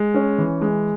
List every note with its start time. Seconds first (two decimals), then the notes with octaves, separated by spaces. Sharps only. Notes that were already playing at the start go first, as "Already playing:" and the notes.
Already playing: G#3
0.14 C#4
0.38 E3
0.61 G#3